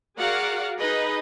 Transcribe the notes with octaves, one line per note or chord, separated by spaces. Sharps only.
F#4 G#4 A#4 D5 F5 F#5
D#4 G#4 B4 D#5